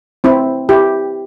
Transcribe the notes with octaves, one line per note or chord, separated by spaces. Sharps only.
C4 E4
E4 G4